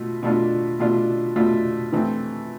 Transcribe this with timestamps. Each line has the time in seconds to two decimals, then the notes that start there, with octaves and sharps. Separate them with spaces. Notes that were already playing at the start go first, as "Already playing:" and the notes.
Already playing: B2 A3 F4
0.23 B2 A3 D4 F4
0.80 B2 A3 D4 F4
1.36 B2 A3 D4 F4
1.92 E3 A3 C4